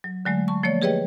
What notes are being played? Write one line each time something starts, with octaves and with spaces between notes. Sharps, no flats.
F#3
D3 F#3 G#3 A3
A5 C#6
F3 A3 A#3 C#5 D5
G4 G#4 B4 C#5 D#5 G5